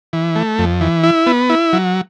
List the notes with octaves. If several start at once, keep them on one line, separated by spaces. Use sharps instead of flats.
E3
A3
F2
E3
E4
B3
E4
F#3